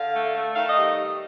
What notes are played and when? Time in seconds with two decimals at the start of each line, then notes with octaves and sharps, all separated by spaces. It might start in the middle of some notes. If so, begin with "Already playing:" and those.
Already playing: D3 F5
0.14 A3
0.34 A3
0.55 D#3 F5
0.69 D#5
0.75 G3